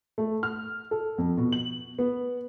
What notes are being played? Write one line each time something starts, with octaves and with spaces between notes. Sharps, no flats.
A3
F6
A4
F2
B2
F#7
B3